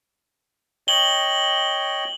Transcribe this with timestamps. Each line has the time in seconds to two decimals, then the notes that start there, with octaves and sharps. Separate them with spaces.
0.88 C#5 D#5 G5 F#7 G7